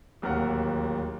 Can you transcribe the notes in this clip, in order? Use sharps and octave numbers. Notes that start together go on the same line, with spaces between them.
D1 D#2 A#4 F#5